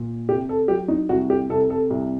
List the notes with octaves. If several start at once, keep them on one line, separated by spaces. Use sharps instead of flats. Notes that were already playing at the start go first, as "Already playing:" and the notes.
Already playing: A#2
C3 G4
A4
F#3 G4
D#4
C2 F#4
G4
C3 A4
A4
C2